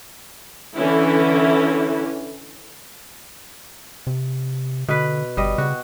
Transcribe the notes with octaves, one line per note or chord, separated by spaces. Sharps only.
D3 E3 C#4 E4
C3
B2 D3 B4
G1 G3 D#5
C#3 F#4